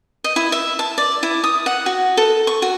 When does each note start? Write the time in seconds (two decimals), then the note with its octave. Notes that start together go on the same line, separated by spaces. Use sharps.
0.24 D#5
0.36 E4
0.52 E5
0.79 A5
0.98 D5
1.23 E4
1.44 D#6
1.66 F#5
1.86 F#4
2.17 A4
2.47 C#6
2.62 F#4